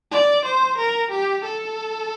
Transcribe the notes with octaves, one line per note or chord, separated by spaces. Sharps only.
D5
C5
A#4
G4
A4